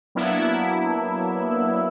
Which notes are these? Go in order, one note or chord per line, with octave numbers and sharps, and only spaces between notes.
F#3 A#3 B3 D4 E4